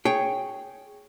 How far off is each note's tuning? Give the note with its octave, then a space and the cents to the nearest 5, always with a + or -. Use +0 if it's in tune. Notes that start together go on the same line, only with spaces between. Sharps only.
G#4 +0 C#5 +0 G5 +0